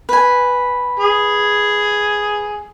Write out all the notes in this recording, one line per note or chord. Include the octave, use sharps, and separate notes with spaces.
B4 G#5
G#4